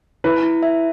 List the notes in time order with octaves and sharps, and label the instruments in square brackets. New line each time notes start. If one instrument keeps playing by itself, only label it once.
[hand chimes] E4 [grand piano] B4
[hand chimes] E4
E5